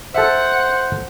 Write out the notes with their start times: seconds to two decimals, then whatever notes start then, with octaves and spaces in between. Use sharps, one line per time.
0.14 A4 C5 E5 F#5